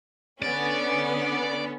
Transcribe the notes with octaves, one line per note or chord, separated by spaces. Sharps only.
D3 B3 C#4 D5